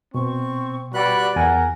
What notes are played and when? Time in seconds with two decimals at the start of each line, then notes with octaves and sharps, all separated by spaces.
0.14 B2 C4 C#6
0.94 G3 F#4 B4 D5 F#6
1.36 E2 A#4 F#5 G#5